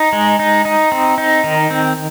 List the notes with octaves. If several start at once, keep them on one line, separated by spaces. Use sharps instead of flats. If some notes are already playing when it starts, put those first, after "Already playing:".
Already playing: D#4
G#3
D#4
D#4
C4
D#4
D#3
C4